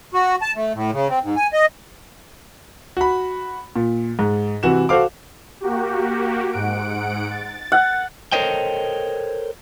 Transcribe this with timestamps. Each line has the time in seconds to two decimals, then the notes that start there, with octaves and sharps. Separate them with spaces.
0.14 F#4
0.42 A5
0.56 A3
0.75 A2
0.93 C#3
1.09 C4
1.23 G#2
1.36 G#5
1.53 D#5
2.97 F#4 B5
3.76 A#2
4.19 G#2
4.63 C3 E3 F#4 E7
4.89 F#4 A4 C5 F5 D6
5.60 A#3 F#4 G4
6.51 G#2 F#5 D7
7.30 A6
7.72 F#5
8.32 A4 A#4 C5 C#5 D#5 G5